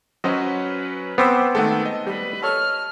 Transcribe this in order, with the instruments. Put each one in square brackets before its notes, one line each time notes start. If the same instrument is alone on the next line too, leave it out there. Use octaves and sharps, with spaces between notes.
[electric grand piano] F#3 C#4 [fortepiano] F#4 C5 D#5 [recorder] B4
[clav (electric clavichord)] B3 C4 [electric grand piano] C5 D6 E6
[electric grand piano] D#3 A3 A4 [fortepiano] G#3 F#5
[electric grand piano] D#5
[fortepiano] G3 [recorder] B4
[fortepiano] A4 C#5 [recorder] F6